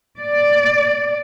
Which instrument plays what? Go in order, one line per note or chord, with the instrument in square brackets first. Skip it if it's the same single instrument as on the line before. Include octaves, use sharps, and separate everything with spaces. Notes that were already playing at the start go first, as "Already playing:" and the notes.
[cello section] D5